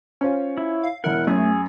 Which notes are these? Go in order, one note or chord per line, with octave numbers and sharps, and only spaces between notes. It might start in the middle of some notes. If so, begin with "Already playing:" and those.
C#4 F4 C5 C#5
E4
F5
E1 E4 A#4 F#5
F#2 A3 G#4